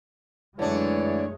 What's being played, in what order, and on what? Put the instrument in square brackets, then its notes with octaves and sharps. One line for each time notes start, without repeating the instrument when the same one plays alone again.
[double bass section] F#2 G#3 A3 [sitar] D3 D4 [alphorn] E3 [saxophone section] C#5